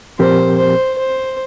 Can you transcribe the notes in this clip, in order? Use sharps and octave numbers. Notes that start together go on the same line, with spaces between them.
A#2 F3 C4 G4 A#4 C5
C5
C5